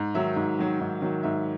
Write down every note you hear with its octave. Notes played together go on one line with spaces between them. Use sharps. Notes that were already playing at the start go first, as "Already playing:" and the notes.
Already playing: G#2
D#3 F#3 E5
G#2
D#3 F#3
G#2
D#3 F#3
G#2 E5